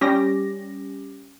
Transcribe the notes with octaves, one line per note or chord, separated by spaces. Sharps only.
G3 C#4 G4 A#6